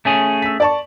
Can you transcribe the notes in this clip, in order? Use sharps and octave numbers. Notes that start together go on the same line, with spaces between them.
A3 C#4 G#4
E6 B6
D5 A5 C#6